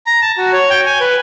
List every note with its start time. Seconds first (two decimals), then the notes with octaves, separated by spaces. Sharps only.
0.07 A#5
0.22 A5
0.38 F#4
0.53 C#5
0.70 G5
0.86 G#5
1.00 B4